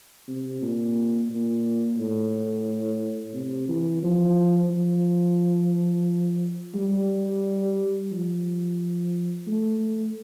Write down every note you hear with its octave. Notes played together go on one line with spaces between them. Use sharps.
C3
A#2
A#2
A2
C3
E3
F3
F3
G3
F3
A3